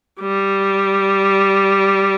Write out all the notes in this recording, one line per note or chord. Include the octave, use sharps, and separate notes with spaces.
G3